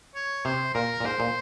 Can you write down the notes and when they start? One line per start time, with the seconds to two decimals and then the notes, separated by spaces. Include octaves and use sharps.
0.15 C#5
0.45 C3 C5
0.74 A#2 A#4
1.00 A#2
1.04 G#2 C5
1.20 A#2